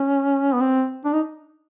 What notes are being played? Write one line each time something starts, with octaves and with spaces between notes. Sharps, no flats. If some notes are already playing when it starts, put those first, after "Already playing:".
Already playing: C#4
B3
C4
D4
D#4